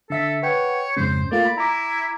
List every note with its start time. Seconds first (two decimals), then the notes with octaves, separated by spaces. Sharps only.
0.10 D3 A4 E5 B6
0.43 B4 C#5 F#5 G5
0.96 F2 G#2 C#3 C5
1.32 A3 A#3 F4 D5
1.45 B5
1.57 E4 A#5 D6